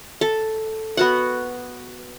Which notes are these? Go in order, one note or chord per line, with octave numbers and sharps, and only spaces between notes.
A4
B3 F#4 F#5